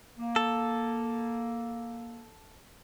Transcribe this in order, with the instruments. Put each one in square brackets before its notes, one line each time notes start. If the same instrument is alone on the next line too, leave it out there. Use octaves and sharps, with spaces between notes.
[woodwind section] A#3
[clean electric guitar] A4